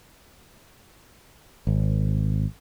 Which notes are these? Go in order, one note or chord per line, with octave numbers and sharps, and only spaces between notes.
G#1